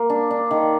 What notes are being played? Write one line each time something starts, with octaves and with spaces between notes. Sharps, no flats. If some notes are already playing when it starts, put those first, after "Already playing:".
Already playing: A#3
D4
D4
D#3